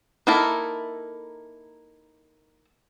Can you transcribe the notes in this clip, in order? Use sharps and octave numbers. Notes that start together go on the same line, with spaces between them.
A#3 D#4 E4 A4 A#4